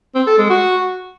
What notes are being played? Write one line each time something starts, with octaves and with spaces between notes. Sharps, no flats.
C4
A4
G#3
F#4